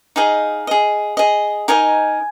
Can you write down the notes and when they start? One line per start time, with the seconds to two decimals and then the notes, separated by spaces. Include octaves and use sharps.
0.16 D#4 G#4 D#5 F5
0.67 G#4 D#5
1.17 G#4 D#5
1.68 D#4 A#4 D#5 G#5